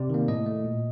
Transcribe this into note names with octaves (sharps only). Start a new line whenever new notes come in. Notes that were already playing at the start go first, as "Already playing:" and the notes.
Already playing: C3 D5
D#3 A#3
A2 D#5
A3
A#2